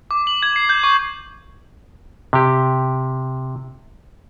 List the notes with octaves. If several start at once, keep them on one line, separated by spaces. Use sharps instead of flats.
D6
F#7
G#6
C7
G6
C#6
C3 G4